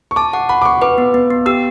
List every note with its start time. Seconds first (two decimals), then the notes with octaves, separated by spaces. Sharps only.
0.11 C#6
0.16 A5 D6
0.33 F#5 C#6
0.49 F#5 B5
0.62 D6
0.65 F#5 C#6
0.82 B4 D6
0.98 B3
1.14 B3
1.30 B3
1.46 G4 E6